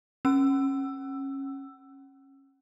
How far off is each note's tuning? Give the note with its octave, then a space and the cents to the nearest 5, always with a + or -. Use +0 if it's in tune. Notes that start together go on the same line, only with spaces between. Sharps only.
C#4 -25 E6 +10